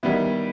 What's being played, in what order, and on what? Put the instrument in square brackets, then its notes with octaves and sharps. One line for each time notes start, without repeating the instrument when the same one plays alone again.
[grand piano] D#3 G3 B3 E4